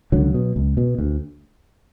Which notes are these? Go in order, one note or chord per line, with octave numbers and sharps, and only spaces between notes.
C#2 D3 F#3
B2
C#2
B2
D2